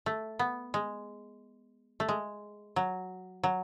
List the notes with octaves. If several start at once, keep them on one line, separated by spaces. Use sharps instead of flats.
A3
B3
G#3
A3
G#3
F#3
F#3